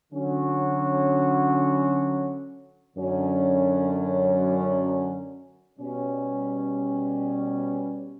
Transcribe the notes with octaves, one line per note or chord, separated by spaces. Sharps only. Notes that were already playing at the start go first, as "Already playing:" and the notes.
D3 F#3 C#4 F#4
F#2 D3 F#3 C#4
B2 G3 C#4